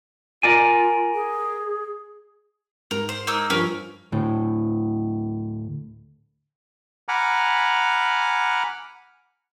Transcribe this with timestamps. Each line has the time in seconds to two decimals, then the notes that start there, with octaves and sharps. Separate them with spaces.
0.43 F4 A#4 D5 G#5
1.14 G#4
2.91 G#2 A#4
3.09 C5
3.27 A#3 D#4 E6
3.50 G2 F3 C#4 A#4
4.12 D2 A2
7.09 F#5 G#5 A#5 B5 D6 F6